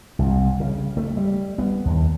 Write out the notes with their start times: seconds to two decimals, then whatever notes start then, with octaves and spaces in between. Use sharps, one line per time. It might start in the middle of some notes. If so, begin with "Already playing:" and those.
0.19 C2
0.60 C#3
0.97 A3
1.17 G3
1.58 B3
1.85 D#2